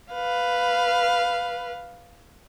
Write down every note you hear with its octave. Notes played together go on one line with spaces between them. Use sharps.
B4 F5